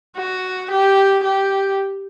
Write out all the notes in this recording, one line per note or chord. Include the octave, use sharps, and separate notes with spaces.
F#4
G4
G4